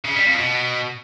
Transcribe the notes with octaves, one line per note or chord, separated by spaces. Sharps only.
C#3
G3
F2
B2